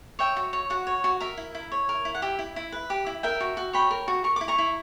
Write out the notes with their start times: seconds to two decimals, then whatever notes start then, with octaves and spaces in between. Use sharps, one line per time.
0.19 C#5 E5 G5
0.36 F#4
0.53 C#5
0.70 F#4 F#5
0.87 C#5
1.04 F#4
1.21 A#4 E5
1.37 E4
1.55 E4
1.72 C#5
1.89 A#4
2.05 E4
2.15 F#5
2.22 G4 E5
2.39 E4
2.56 E4
2.72 B4
2.90 G4
3.07 E4
3.23 A#4 E5 G5
3.40 F#4
3.57 F#4
3.73 C#5 G5 B5
3.91 A#4
4.08 F#4
4.24 A#4 C#6
4.36 E4 D6
4.48 A#5 C#6
4.58 E4